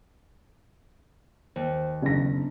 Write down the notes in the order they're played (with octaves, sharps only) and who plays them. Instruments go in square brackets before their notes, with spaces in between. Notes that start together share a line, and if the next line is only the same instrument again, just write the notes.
[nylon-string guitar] D#2 [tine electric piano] C5
[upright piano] F#1 A#6 [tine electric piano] B3 D4